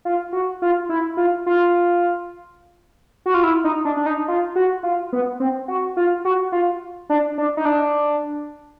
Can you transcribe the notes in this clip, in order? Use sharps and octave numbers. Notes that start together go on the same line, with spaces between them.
F4
F#4
F4
E4
F4
F4
F#4
F4
E4
D#4
D4
D4
D#4
F4
F#4
F4
B3
C4
F#4
F4
F#4
F4
D4
D4
D#4
D4